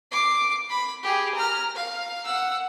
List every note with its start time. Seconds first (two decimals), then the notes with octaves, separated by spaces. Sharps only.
0.12 D6 C7
0.70 B5
1.03 G4 G#4
1.35 A#5 F6
1.75 F5
2.25 F#5 E6